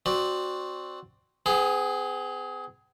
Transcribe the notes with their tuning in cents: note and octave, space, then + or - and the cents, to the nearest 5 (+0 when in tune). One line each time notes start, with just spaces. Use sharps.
C4 +0 F#4 +0 D5 +15
B3 +45 G#4 -5